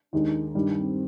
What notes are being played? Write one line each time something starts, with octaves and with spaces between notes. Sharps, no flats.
D#2 D#3 G#3 D4 D#4
G2 D#3 G3 D4
C4